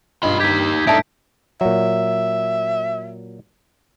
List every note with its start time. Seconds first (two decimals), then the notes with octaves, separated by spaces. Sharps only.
0.23 G2 F4 D#5 B5
0.40 D#4 G4 G6 G#6 B6
0.87 A2 D4 D#4 A4 E5 A5 G#6 D7
1.61 A#2 F#3 E5